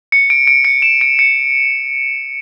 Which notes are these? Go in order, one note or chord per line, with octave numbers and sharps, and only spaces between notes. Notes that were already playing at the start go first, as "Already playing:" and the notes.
C#7
D7
D7
C#7
E7
D7
C#7